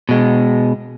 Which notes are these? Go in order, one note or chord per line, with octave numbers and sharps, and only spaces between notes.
B2 G#3